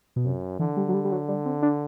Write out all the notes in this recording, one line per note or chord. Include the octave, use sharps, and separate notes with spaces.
B2
F#2 C3
D3 E3
G3
F#3
G3
G3
F#3
G3
C4
D4